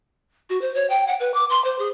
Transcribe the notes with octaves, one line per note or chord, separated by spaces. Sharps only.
F#4
C5
C#5
G5
F#5
B4
D6
C6
C5
G#4